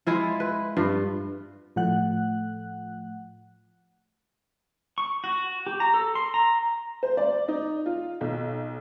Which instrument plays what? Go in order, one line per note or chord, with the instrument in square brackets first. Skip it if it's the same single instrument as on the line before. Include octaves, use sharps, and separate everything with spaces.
[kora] G#3 E4 F4
B4
G2 F4
[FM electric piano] A2 F3 A3 F#5 F#6
[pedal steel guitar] C#6
F#4
G4
A#5
A4
C6
A#5
[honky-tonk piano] C5
D5
D#4
F4
B1